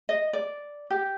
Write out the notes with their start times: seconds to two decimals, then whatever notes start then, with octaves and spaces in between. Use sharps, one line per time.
0.09 D#5
0.33 D5
0.90 G4